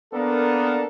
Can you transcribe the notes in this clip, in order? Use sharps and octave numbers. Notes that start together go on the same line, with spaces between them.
A#3 B3 D4 A4 A#4